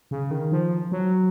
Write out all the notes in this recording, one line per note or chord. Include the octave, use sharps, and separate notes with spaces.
C#3
D#3
F3
F#3